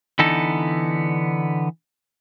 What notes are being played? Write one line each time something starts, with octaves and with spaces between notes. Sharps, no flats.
D3 E3 B3 D#4 A4